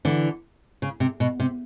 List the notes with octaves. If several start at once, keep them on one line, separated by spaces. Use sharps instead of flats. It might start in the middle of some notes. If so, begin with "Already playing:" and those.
D3 E3
C#3
C3
B2
C3